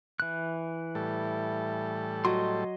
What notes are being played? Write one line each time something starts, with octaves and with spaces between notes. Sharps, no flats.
E3 F#6
A2 G3 A4
F#3 D#5 C6